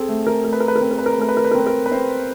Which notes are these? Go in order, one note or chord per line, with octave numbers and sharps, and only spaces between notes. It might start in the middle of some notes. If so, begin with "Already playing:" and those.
Already playing: C4 G#4 A4
A3
A#4
A3 A#4
B4
A#4
B4
A#4
C4 B4
A#4
B4
A#4
B4
A3 A#4
B4
A#4
B4
A#4
C4
B4
A#4
B4
C4 C5